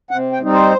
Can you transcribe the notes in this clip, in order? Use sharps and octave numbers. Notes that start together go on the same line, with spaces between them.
C3 F#5
G5
G3 C4 D#4
C5